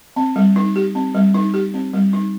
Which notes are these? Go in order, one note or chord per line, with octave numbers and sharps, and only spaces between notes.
C4
G3
D#4
G4
C4
G3
D#4
G4
C4
G3
D#4